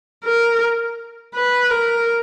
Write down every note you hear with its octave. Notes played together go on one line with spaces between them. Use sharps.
A#4
B4
A#4